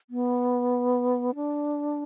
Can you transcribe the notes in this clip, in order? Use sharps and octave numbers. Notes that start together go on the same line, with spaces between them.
B3
D4